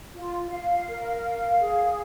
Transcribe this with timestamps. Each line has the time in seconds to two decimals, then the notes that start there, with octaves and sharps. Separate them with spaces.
0.14 F4
0.51 F5
0.88 A#4
1.24 F5
1.60 G#4